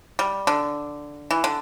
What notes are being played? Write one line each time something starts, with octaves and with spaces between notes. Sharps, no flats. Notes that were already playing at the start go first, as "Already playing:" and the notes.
G3
D3
E3
D3